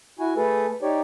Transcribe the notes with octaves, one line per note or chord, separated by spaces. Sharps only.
E4 F#4 G#5
A3 G#4 A4 B4
D#4 G4 C#5 D5